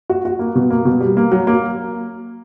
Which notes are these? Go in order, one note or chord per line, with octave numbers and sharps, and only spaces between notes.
F#4
F#4
A#3
B2
A#3
B2
G3
A#3
F#3
A#3